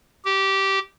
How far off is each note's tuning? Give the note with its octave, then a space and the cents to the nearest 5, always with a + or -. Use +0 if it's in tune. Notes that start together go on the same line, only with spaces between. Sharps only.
G4 -15